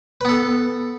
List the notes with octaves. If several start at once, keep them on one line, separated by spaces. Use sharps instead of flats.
B3 A4 B4